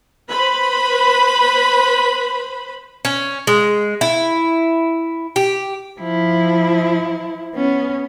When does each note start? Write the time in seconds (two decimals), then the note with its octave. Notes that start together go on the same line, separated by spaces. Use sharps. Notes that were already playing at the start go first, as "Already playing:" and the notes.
0.30 B4 C5 B5
3.05 C#4
3.47 G#3
4.01 E4
5.36 G4
6.00 F3 E4
7.55 B3 C#4